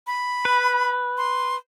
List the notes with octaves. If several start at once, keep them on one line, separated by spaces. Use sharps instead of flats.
B5
B4
C6